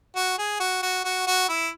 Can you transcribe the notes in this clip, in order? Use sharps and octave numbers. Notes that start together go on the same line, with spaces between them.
F#4
G#4
F#4
F#4
F#4
F#4
E4